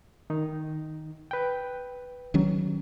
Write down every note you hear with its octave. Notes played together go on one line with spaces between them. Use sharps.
D#3 D#4
B4 G5
D#3 F#3 C#4